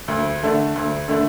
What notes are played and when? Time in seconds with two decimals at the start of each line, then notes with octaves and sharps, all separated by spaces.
0.08 D2
0.42 D3 A3 D4
0.76 D2
1.08 D3 A3 D4